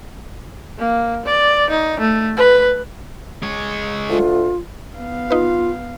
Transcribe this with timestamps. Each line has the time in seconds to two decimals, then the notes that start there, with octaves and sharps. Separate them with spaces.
0.78 A#3
1.26 D5
1.69 D#4
2.00 A3
2.37 B4
3.42 G#3 C#5
4.09 D2 F4
4.96 B3 F5
5.30 D#4 F4 B4